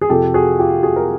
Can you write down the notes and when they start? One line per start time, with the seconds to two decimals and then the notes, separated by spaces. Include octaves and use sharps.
0.01 G#4
0.10 F2 C3 F3 G4 A4
0.34 F#4 G#4
0.59 F4 G4
0.83 F#4 G#4
0.96 A#4